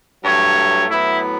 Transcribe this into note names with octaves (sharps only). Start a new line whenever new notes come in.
G2 F#3 A3 C#5
A2 F#3 B3 E4